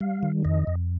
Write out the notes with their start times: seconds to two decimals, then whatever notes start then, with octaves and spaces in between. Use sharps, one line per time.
0.01 G3 F5
0.23 D#3
0.45 F2 D#5
0.67 F2